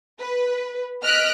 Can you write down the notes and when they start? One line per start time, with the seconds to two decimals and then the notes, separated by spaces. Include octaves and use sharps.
0.19 B4
1.02 D#5 F6 F#6 B6 D7